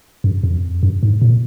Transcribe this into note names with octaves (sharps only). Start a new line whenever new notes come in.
F#2
F2
F#2
G#2
A#2